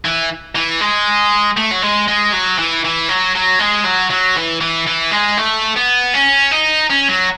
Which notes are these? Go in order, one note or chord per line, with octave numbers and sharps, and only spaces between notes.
E3
E3
G#3
A3
F#3
G#3
G#3
F#3
E3
E3
F#3
F#3
G#3
F#3
F#3
E3
E3
E3
G#3
A3
B3
C#4
D#4
C#4
F#3